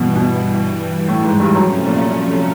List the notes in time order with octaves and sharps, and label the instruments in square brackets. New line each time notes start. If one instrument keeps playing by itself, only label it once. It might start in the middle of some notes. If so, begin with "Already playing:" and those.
Already playing: [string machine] G2 E3 G3 [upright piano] B2
[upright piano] B2
A2
G#2
G2
[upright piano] F#2 [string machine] C3 F3 A3 C#4
[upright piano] A#2